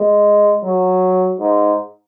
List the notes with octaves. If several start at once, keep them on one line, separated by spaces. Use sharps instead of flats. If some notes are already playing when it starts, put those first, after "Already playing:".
Already playing: G#3
F#3
G#2